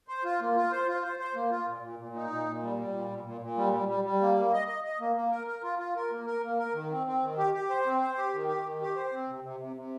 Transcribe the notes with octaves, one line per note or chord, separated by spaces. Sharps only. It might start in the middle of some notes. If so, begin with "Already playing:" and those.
C5
F4
A#3
F4
C5
F4
C5
C5
A#3
F4
A#2
A#2
A#2
D#4
A#2
A#2
G3
G3
A#2
A#2
A#2
A#2
G3
G3
G3
G3
A#3
A#3
D#5
D#5
D#5
A#3
A#3
A#4
A#4
F4
F4
A#4
A#3
A#4
A#3
A#4
D#3
C4
C4
D#3
G4
G4
C5
C4
C5
G4
D#3
G4
D#3
G4
C5
C4
C3
C3
C3
C3